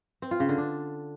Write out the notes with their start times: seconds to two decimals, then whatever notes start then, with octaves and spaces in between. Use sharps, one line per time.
0.22 C4
0.31 F4
0.40 C#3
0.49 D3
0.58 D4